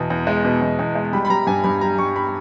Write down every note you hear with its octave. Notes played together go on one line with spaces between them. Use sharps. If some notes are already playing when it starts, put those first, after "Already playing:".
Already playing: E2 B2
E2
G#3
B2
E2
E2
G#3
G3 B5
B5
G3 A#5
G2 G#5
G2 B5
G3 A#5
G3 C#6
B5